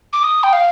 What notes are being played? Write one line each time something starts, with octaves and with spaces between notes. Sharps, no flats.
D6
D#6
G5
F5